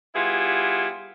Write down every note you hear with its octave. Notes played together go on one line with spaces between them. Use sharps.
G3 B3 E4 F4 G#4